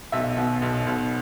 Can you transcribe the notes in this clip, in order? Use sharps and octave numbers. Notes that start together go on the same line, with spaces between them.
B1 E5
B2
B1
B1